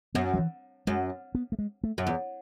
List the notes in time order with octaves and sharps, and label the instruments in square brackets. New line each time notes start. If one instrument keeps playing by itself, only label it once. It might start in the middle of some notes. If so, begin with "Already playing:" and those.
[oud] F#2 [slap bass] B3
[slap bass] F#3
E3
[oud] F#2 [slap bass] G#3
[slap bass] B3
A3
G#3
A3
[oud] F#2
E2